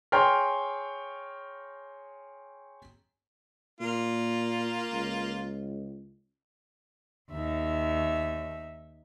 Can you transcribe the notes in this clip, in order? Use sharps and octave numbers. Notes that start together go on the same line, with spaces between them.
G#4 C#5 G5 A#5 C6 F6
A#2 A#3 F4
C#2
D#2 D#4 E5